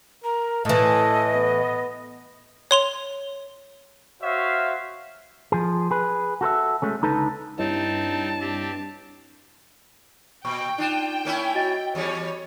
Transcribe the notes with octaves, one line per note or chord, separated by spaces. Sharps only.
A#4 A#5
A2 E3 A4 D#5
B3
C#5 C6 F7
F#4 C5 C#5 E5 F5
F3 G#4
G#4 B4
F#4 A4 C5 E5
G#3 A3 C#4
C#2 D3 D#4 A4 B4 A5
G2 C4 D#4 E4 C#5 D#5 A5
C4 G4
A#2 G5 C#6
D4 D#4 F4 E7
A#3 C#4 E4
F#4 D#5 A6
E2 G3 C#4 C#5